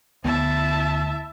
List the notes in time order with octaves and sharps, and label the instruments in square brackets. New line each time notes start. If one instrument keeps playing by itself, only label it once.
[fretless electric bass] D2 B3 [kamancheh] E4 E5 [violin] A5